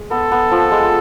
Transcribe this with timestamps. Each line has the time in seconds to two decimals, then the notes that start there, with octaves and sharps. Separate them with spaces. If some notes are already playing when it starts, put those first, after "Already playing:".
Already playing: G#3
0.11 B3 A4
0.31 B3
0.51 F3
0.72 G#3